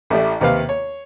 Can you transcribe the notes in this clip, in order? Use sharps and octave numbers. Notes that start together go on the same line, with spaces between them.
A1 A3 E4 G4 D5
D#2 C3 B4 F5
C#5